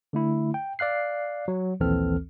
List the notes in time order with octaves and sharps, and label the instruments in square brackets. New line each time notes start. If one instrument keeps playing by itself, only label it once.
[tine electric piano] D3 A3 E4
G5
D5 F5 F#6 C7
F#3
A#1 D#2 E3 C4 A4 F6